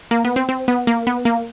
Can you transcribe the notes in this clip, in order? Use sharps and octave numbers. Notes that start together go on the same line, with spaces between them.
A#3
B3
C4
C4
B3
A#3
B3
A#3